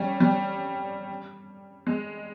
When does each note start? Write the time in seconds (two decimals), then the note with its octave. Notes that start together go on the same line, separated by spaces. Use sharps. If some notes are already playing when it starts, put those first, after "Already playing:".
Already playing: G3 C#4
0.20 G3
1.87 G#3